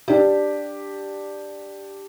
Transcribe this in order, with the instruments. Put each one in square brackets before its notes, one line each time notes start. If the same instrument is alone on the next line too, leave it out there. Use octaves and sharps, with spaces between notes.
[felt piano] D4 G4